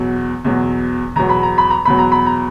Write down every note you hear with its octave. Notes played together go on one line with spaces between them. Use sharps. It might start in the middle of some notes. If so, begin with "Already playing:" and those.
Already playing: E2 B2 F#3
E2 B2 F#3
E2 B2 F#3 A#5
B5
A#5
B5
A#5
E2 B2 F#3 B5
A#5
B5
A#5